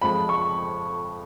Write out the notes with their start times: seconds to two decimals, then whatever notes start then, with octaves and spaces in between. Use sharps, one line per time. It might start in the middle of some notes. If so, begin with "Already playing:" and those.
0.02 F2 F3 G#3 B5
0.29 C#6